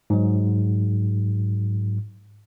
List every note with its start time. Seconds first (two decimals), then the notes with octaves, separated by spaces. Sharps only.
0.10 G#2 F#3